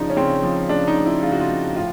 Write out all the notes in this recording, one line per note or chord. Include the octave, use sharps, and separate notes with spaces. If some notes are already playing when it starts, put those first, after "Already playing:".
Already playing: C#3 F3 D4 D#4
C#4
C#3 C4
F3
C#3 D4
D#4
F3
E4
C#3 F4
F#4
F4
F3
A2 F4